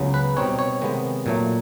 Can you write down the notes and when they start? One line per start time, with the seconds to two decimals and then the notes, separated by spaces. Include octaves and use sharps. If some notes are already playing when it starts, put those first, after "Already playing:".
Already playing: C#2 C#3 F#3 B3
0.14 B4
0.37 B2 G3 C4 D#4 C#5
0.59 C#5
0.81 C3 D#3 G#3 B3
1.26 A#2 F#3 A3